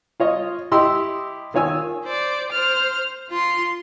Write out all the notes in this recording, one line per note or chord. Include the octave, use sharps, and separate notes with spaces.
F4 C#5 D#5
E4 G4 D#5 C6 E6
D#3 F4 C#5 G#5 E6
C5 D5
C5 F6
F4 C6